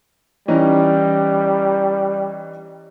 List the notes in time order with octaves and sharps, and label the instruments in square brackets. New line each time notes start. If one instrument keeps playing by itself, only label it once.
[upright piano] E3 C#4 D#4 [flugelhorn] G3